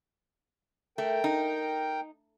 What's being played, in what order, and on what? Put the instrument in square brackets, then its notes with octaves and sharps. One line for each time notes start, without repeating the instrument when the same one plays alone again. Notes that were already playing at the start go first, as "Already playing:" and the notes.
[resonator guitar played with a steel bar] A3 [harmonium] A#4 G5
[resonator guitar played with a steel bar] D#4